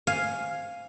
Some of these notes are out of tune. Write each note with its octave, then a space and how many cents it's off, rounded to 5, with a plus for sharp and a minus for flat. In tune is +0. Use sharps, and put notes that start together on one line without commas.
F5 +0 G#5 +0